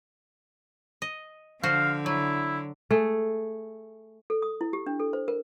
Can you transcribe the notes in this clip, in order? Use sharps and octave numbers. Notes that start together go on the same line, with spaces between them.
D#5
D3 F3 F#4 C5 F5
F#3 E4
A3 G#4
A4
D#6
E4
G4
D4
A4
C5
A#4